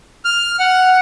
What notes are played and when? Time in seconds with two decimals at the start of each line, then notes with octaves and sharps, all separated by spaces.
0.25 F6
0.59 F#5